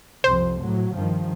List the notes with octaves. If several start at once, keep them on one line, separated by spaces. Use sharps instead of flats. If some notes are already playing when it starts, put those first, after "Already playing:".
C2 F2 C5
A2 F#3
G2 D#3 F3